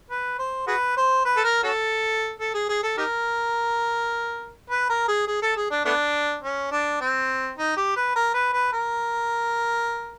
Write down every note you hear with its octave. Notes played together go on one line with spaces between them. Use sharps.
B4
C5
F#4 G#4 B4
C5
B4
A4
A#4
C#4 F#4 A4
A4
G#4
G#4
A4
D#4 G4 A#4
B4
A#4
G#4
G#4
A4
G#4
D4
A3 B3 D4
C#4
D4
C4
D#4
G4
B4
A#4
B4
B4
A#4